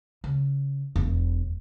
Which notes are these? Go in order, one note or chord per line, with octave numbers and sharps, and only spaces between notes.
C#3
E1